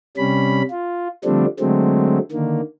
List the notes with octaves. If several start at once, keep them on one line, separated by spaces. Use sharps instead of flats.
C3 G3 C#4 B5
F4
D3 F3 G3 A3 C4 D4
D3 F#3 G#3 A3 C4
D3 D#3 A#3